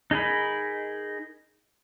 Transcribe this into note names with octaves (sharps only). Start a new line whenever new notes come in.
D#4 G#4 A#4 B5